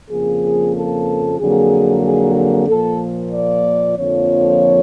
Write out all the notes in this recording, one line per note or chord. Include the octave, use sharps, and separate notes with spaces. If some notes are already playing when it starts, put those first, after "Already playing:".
F2 C#3 F3 A#3 G#4
A4
F2 D3 F#3 A#3 G#4
G#4
G#4
A#2 F3 A#3 A4
D5
F2 D3 F3 A#3 C#5